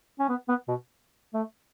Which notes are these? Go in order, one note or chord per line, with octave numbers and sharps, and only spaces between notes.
C#4
B3
B3
B2
A3